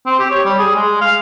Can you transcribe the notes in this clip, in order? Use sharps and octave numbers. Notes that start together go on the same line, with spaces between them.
C4
G4
C#5
G3
G#4
G#3
F5